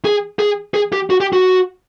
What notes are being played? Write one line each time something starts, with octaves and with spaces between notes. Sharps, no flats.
G#4
G#4
G#4
G4
F#4
G4
F#4